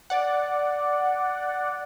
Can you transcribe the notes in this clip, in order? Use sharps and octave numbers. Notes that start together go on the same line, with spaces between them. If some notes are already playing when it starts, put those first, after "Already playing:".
D5 F#5